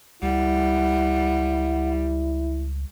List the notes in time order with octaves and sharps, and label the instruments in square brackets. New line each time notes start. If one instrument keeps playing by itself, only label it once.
[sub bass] C#2 [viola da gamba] G3 [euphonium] E4 [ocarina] F#5